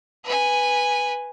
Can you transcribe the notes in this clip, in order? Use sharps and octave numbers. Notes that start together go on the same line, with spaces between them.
B4 G#5